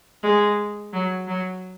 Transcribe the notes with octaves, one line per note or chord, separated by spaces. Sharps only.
G#3
F#3
F#3